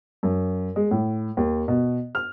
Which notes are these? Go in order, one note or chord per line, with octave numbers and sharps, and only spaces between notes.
F#2
G#3
A2
D#2
B2
F6